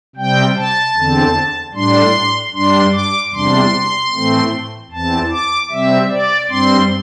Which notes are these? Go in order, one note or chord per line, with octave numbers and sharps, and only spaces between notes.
C3 G3 C4 G5
A5
E2 D3 C4
A2 G3 D4 C6
G2 G3 D4 C6
D6
E2 C3 G3 D4 C6
A2 E3 A3 C4
E2 E3 C4 A5
D6
C3 G3 C4 E5
D5
G2 G3 C4 C6